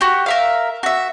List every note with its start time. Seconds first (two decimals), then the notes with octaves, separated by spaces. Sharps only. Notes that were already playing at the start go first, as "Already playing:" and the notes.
0.01 F#4 G4
0.26 A#4 E5 F5
0.83 F#4 E5